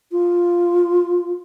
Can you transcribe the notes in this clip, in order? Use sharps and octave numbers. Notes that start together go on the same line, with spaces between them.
F4